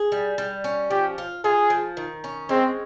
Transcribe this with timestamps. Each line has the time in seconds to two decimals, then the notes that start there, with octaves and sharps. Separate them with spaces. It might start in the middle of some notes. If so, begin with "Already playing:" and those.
Already playing: G#4
0.12 G3
0.38 G3
0.64 C#4
0.90 F3 G4
1.18 F4
1.44 F4 G#4
1.70 F3
1.97 D#3
2.24 C#4
2.49 G#3 C4